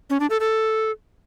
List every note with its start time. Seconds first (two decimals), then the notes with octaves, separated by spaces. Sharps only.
0.10 C#4
0.20 D4
0.30 A4
0.40 A4